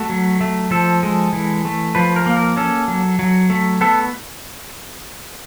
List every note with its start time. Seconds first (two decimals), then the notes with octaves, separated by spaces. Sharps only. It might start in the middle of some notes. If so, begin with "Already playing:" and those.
Already playing: A3 F#4
0.10 F#3
0.41 A3
0.71 F3 A4
1.03 G#3
1.33 E3
1.65 A3
1.95 F3 B4
2.16 A#4
2.26 A#3
2.37 A#4
2.57 C#4 A4
2.88 F#3
3.19 F#3
3.50 A3
3.81 B3 A4